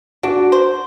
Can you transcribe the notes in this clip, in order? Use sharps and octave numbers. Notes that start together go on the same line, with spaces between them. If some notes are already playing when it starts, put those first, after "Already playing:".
D4 F#4
C5